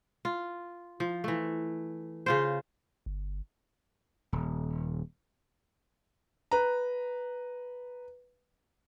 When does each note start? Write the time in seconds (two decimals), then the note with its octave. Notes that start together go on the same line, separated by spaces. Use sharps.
0.25 F4
1.00 F3
1.24 E3 A3
2.26 C#3 F4 C5
3.06 G1
4.32 D#1
6.51 B4 A#5